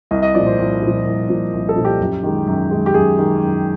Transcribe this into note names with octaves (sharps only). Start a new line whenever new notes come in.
C2 D#5
D#5
A#2 F3 D5
C5
C2
A#2 F3
C2
A#2 F3
C2
A4
A#2 F3
G4
F#2
D#3 G#3
F#2
D#3 G#3
G4
F#2 G#4
D#3 G#3
F#2